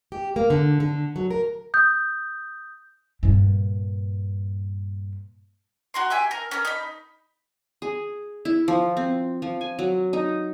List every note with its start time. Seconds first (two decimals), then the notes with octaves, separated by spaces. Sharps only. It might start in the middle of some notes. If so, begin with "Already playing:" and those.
0.12 G4
0.36 A#3
0.50 D3
0.80 D3
1.16 F#3
1.31 A#4
1.74 D#6 G6
3.23 G2 A#2
5.94 F#4 A#4 C6
6.10 G4 E5 G#5
6.31 A#4
6.51 C#4 A#4
6.65 D#4 B5
7.82 G#4
8.45 E4
8.68 F3
8.97 C4
9.42 F3
9.61 G#5
9.79 F#3
10.13 D#4